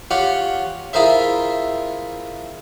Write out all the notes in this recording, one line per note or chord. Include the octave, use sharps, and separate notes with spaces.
F4 G4 C#5 F#5
E4 F4 G#4 A#4 C5 E5